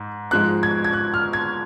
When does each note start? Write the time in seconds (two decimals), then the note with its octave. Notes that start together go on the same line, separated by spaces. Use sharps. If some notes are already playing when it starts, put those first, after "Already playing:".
Already playing: G#2
0.31 G#2 F3 G#3 F#6
0.63 G#6
0.84 G#6
0.93 F#6
1.14 F6
1.33 G#6